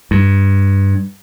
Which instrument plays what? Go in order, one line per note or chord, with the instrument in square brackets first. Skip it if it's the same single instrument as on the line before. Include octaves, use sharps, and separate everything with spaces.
[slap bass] G2